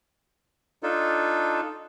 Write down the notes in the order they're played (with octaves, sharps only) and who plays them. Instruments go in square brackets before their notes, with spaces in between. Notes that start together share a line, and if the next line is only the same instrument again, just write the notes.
[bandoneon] D4 D#4 F4 A4